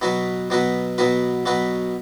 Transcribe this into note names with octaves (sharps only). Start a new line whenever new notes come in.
B2 F#3 B3 F#4 B4
B2 F#3 B3 F#4 B4
B2 F#3 B3 F#4 B4
B2 F#3 B3 F#4 B4